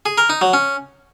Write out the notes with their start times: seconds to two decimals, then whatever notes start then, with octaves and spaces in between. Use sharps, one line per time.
0.06 G#4
0.18 A#4
0.30 D#4
0.41 F#3
0.53 C#4